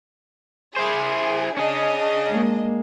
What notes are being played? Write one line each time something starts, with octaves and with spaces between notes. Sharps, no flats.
E4 G#4 C5
C#4 D4 G#4 D#5
G#3 A#3